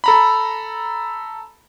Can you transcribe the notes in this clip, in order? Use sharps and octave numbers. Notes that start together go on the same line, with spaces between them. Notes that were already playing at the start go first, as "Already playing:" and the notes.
A4 A#5 B5